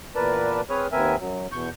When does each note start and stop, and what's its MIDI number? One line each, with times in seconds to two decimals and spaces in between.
0.16 0.61 40
0.16 0.61 46
0.16 0.61 70
0.16 0.61 71
0.16 0.61 74
0.16 0.61 81
0.70 0.87 60
0.70 0.87 68
0.70 0.87 71
0.70 0.87 73
0.70 0.87 87
0.70 0.87 89
0.92 1.16 39
0.92 1.16 59
0.92 1.16 60
0.92 1.16 70
0.92 1.16 76
0.92 1.16 80
1.19 1.47 42
1.19 1.47 54
1.52 1.70 40
1.52 1.70 47
1.52 1.70 85
1.52 1.70 91